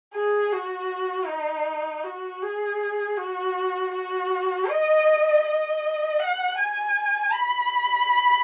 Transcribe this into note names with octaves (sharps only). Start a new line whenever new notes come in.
G#4
F#4
D#4
F#4
G#4
F#4
F#4
D#5
D#5
F#5
G#5
B5